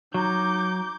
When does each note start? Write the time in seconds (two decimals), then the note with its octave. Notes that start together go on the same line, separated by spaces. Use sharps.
0.14 F#3 D#4 D6 G6